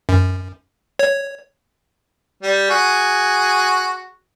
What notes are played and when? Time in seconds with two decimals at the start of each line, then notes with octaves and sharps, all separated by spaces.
0.09 F#2
0.99 C#5
2.43 G3
2.70 F#4 G#4